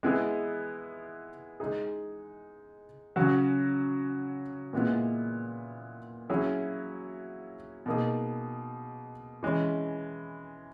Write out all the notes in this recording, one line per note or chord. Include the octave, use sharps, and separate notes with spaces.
G#3 B3 E4 G#4
G#3 D#4 G#4
C#3 F#3 C#4 F#4
A#2 G#3 B3 E4
F#3 C#4 E4 G#4
B2 A#3 D#4 G#4
E3 G#3 C#4